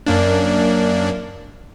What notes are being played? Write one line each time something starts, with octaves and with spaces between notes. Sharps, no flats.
F#2 A#3 D4